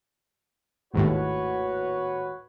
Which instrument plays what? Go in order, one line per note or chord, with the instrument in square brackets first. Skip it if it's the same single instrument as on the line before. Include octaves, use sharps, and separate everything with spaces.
[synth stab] G#1 D#2 A2 [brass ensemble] F#4 B4 C#5